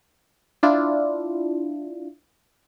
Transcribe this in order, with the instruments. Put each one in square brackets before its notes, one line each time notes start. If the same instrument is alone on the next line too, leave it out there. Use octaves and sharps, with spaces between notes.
[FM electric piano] D4 E4 F4